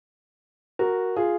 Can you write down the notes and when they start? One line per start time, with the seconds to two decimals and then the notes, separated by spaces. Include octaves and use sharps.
0.79 F#4 A#4
1.16 F4 G#4